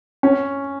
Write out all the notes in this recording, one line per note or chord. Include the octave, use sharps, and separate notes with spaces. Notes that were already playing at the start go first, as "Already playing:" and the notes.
C#4